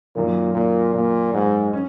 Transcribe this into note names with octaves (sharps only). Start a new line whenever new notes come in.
F#2 A#2 D#3 A#3
A#2
A#2
G#2
C#4